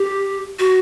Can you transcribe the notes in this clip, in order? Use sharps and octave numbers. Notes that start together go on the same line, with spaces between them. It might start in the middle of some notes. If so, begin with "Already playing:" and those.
Already playing: G4
F#4